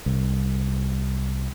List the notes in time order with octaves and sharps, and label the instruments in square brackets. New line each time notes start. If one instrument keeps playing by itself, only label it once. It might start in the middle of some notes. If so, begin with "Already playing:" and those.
[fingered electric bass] C2